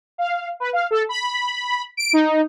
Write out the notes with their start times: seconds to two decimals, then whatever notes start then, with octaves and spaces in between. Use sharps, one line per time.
0.18 F5
0.60 B4
0.73 F5
0.91 A4
1.09 B5
1.97 D7
2.13 D#4